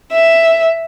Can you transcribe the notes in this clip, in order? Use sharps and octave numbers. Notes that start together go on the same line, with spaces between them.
E5